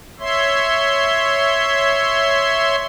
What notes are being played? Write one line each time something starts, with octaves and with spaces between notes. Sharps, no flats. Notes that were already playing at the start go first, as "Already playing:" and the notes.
C#5 E5 C6